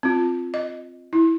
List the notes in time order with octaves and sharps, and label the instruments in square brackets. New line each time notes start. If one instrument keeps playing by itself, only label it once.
[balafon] C4 F4
D#5
E4